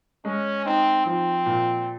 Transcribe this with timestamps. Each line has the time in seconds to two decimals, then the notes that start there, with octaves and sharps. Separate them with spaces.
0.25 G#3 C#4
0.65 C4 D#4
1.05 F3 C4
1.46 A#2